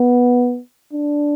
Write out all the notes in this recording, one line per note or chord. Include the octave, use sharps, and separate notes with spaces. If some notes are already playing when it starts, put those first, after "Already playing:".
Already playing: B3
D4